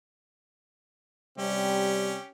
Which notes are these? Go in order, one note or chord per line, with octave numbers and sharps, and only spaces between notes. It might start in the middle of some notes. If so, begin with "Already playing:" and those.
C3 G3 C#4 G4